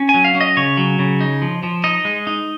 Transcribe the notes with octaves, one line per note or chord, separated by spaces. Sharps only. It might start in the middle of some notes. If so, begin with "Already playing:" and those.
Already playing: C#4
G#5
F#3
F5
C#4
D#5
C#3 C#5
F#3
C#3
D#4
F3
F3
D#4 D#5
G#3
D#4